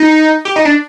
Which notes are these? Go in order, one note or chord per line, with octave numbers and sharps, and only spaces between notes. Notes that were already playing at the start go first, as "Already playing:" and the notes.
Already playing: D#4
G4
D#4
D4